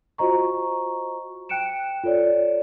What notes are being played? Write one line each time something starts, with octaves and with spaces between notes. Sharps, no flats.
F4 F#4 C5 D#5 A#5 C#6
G5 F#6 C#7 D7 E7
F4 A4 C#5 D5